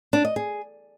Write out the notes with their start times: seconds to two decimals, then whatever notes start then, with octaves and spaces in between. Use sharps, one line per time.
0.13 D4
0.25 D#5
0.36 G#4